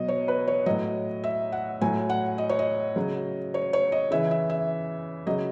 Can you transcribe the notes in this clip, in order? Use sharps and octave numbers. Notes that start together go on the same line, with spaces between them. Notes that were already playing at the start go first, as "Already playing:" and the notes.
Already playing: B2 F#3 D#5
C#5
B4
C#5
A2 F#3 D#5
E5
F#5
A2 F#3 G#5
F#5
D#5
C#5
D#5
C#3 F#3
C#5
C#5
D#5
C#3 E3 E5
E5
E5
C#3 F#3 D#5